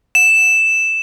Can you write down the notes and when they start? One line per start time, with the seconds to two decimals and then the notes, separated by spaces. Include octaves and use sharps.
0.15 E7